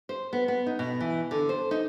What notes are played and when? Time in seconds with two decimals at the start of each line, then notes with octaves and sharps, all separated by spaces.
0.09 C5
0.33 B3
0.48 B3
0.67 D#4
0.79 B2
1.01 E3
1.31 D3
1.49 C5
1.71 D#4